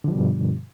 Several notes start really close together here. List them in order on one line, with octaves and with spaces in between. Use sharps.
D3 F3 G3 B2 G2